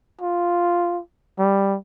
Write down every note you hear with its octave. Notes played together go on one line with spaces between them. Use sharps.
F4
G3